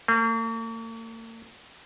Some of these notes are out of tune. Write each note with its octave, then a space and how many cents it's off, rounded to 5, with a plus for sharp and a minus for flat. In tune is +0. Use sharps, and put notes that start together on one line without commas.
A#3 -45